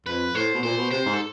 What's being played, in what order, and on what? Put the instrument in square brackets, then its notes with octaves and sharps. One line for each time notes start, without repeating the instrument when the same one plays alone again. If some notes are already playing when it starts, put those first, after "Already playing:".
[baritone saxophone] F2 [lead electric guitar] B4
[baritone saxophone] A2 [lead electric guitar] C5
[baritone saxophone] B2
[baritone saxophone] A#2 [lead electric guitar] C5
[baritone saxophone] B2
[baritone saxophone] C3 [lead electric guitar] C5
[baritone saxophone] G#2
[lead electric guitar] A4